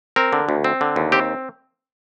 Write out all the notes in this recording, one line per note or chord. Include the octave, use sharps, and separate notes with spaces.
C4 A#4
D3
D2
C4
D3
D#2
C4 G4